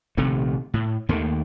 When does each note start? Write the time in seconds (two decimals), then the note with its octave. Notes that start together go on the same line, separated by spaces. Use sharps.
0.17 A#1 C3 D#3 A3
0.74 A2
1.09 D#2 D#3 A3 A#3